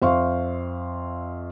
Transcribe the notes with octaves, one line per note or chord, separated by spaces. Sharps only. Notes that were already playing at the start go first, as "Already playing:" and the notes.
F2 C5 E5 F5 C6 C#6